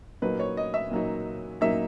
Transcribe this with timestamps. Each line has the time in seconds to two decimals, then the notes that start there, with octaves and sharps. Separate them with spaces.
0.22 A#2 F#3 A#3 D#4 B4
0.40 C#5
0.57 D#5
0.74 E5
0.91 A#2 F#3 A#3 D#4
1.61 A#2 F#3 A#3 D#4 E5